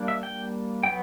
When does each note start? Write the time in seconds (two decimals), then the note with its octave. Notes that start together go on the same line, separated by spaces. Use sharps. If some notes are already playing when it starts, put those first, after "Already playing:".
Already playing: G3 A#3 D4
0.08 E5
0.23 G5
0.83 F#3 B3 G5